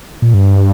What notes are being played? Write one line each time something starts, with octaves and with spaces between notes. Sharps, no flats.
A#2
G2